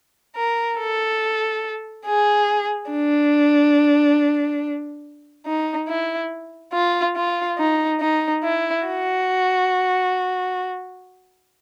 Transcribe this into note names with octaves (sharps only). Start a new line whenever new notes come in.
A#4
A4
G#4
D4
D#4
E4
F4
F4
D#4
D#4
E4
F#4